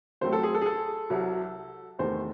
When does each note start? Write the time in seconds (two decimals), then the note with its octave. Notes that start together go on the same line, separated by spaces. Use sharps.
0.21 C2 C3 F#3 A3 C4 C5
0.33 A4
0.43 G#4
0.55 A4
0.61 G#4
0.66 A4
1.10 C2 C3 F#3
1.99 E2 C3 D#3 A3 C5